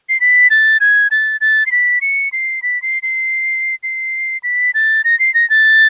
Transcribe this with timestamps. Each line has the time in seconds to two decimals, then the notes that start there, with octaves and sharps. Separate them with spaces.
0.09 C7
0.20 B6
0.50 A6
0.80 G#6
1.11 A6
1.41 A6
1.66 C7
1.72 B6
2.01 C#7
2.32 C7
2.62 B6
2.82 C7
3.03 C7
3.83 C7
4.43 B6
4.74 A6
5.04 A#6
5.19 C7
5.34 A#6
5.50 A6